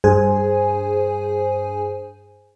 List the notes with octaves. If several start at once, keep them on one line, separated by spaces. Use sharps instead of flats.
G2 G#4 C5 G#5